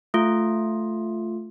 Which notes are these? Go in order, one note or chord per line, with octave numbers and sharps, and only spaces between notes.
A3 F4